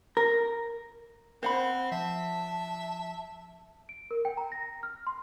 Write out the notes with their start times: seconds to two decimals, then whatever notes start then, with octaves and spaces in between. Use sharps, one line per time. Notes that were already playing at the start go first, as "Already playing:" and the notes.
0.17 A#4
1.43 C4 C5 F#5 B5
1.92 F3 E5 A5
3.89 D7
4.11 A#4
4.25 G5
4.37 A#5
4.52 A#6
4.83 F6
5.07 C6